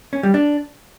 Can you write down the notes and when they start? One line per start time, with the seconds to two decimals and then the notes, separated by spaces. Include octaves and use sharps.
0.13 C#4
0.23 G3
0.34 D4